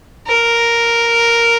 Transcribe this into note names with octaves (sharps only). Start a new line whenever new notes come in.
A#4